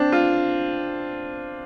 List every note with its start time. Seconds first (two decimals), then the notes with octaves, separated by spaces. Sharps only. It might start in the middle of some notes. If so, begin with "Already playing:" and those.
Already playing: C4 D4
0.12 F4